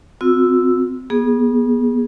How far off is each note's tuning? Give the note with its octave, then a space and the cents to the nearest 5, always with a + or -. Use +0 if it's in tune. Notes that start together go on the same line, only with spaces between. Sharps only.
C4 -25 F#4 -45 E6 +0
B3 -30 G#4 +0